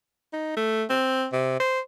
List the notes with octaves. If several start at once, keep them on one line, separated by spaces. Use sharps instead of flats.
D#4
A3
C4
C3
C5